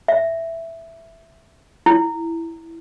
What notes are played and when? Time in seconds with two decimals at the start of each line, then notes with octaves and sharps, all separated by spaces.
0.08 E5
1.86 E4